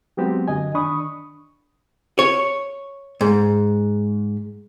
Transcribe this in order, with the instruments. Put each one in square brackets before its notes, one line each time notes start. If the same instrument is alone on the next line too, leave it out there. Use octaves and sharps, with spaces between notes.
[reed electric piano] F#3 G#3 B3 C4 F#4 G4
F#2 D3 D#5 G#5
D#3 D4 B5 C#6 D#6
[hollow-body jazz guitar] C#5
G#2